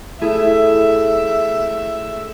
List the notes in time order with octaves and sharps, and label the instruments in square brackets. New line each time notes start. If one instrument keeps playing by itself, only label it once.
[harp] A3 E4 G#4 [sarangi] E5